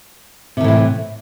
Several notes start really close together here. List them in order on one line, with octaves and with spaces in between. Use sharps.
C3 D#3 A2 E3